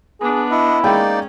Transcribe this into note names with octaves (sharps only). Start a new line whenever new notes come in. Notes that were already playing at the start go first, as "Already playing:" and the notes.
B3 D4 G#4
E4 D#5 F#5
G#3 A#3 C#4 D#4 D5 G5